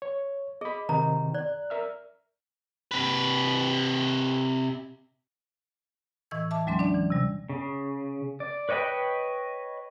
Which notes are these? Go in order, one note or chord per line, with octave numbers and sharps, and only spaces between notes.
C#5
G#4 D#5 B5
C3 D#3 D#4 A#5
D5 F#6
A#4 E5 F6
C3 B4
A2 E3 D#5 E6 G#6
E5 A5 D6
D#2 F#3 G#3 C#4 C6
D4 D5
E3
C3 G3
C#3
D5
B4 C#5 D#5 G5 B5